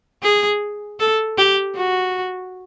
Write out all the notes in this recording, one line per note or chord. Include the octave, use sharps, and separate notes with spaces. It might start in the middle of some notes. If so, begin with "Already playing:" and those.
G#4
A4
G4
F#4